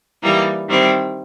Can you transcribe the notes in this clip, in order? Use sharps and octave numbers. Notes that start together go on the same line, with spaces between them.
E3 G3 A#3 D#4
D#3 G3 C4 E4